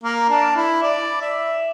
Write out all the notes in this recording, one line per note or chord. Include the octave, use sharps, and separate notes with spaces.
A#3
D4
E4
D5
E5